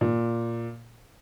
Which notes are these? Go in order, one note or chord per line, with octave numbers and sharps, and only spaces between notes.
A#2